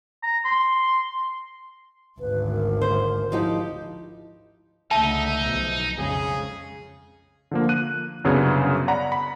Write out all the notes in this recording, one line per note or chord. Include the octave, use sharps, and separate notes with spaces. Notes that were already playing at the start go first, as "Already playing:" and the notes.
A#5
C6
G#1 D2 B4
A#4
C5
F3 D#4 E4 G4
C#2 D3 A3 D#4 E5 A5
B1 F3
F2 C#3 G#3 G#4
D3 F3 A#3
F#6 D#7
C2 F#2 C#3 B3 D4 G#6
D5 F#5 A#5 B5
B5